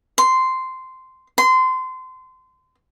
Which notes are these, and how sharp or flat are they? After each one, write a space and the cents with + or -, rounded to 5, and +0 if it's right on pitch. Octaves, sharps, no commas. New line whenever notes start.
C6 -10
C6 -25